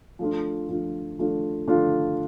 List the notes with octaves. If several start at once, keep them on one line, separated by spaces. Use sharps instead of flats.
F3 A3 D4 F4
F3 A3 D4 F4
F3 A3 D4 F4
F3 A3 D4 F4